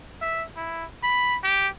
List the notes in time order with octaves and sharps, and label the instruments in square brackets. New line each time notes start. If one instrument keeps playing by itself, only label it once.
[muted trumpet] E5
E4
B5
G4